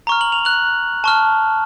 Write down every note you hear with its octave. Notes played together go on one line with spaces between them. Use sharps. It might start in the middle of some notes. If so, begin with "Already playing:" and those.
A#5 C#6 F6
F#7
F7
F#6 F#7
A5 C#6 F6